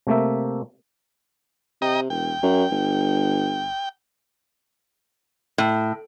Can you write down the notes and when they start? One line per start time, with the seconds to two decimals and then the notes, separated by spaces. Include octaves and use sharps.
0.07 C3 A3 A#3 E5
1.82 C3 D#5 G5 A#5
2.10 E1 G5
2.43 F#2
2.71 G1
5.58 A2